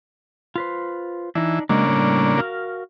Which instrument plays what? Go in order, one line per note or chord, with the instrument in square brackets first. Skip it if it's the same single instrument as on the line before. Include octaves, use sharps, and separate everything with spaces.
[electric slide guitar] F4 B4 C5
[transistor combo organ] E3 [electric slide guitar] D4 D#4
[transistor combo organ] C#3 A#3 D4 [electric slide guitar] F#3 G#3
[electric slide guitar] A2 G3
F#4 A#4 F5